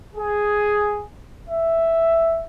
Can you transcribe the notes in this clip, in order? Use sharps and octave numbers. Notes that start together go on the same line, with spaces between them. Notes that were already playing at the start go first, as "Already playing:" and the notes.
G#4
E5